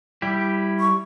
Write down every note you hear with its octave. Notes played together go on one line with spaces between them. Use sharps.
G3 E4 G4
C#6